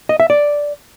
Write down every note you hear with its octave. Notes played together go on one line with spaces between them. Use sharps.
D#5
E5
D5